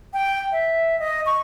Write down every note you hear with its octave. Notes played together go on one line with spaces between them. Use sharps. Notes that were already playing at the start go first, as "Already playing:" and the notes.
G5
E5
D#5
C#6